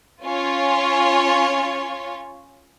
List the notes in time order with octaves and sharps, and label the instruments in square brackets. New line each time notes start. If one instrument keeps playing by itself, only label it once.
[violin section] C#4 F4 C#5